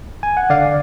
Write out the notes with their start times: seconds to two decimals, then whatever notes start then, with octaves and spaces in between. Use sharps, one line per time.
0.23 G#5
0.37 F#5
0.50 D3 D5 F5